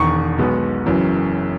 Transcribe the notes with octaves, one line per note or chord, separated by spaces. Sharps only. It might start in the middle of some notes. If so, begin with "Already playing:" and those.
Already playing: E1 E2 D#3 C#6
B1 B2 G#3 B3
F#1 F#2 E3